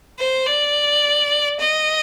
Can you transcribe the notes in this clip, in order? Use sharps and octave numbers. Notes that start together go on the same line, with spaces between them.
C5
D5
D#5